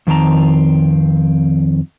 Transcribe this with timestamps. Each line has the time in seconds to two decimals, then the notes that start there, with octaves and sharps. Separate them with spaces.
0.07 F2 D#3 C4 A5 A#5